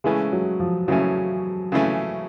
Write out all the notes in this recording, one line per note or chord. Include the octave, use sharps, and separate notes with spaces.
C#3 E3 G#3 A3 C#4
F#3
F3
C#3 E3 F#3 A3 C#4
C#3 E3 A3 C#4